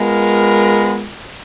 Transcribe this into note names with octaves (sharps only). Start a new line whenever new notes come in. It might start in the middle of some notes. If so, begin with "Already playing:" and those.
Already playing: G#3 B3 F4 A#4